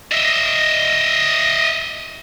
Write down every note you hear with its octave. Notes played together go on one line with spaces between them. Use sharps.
D#5 E5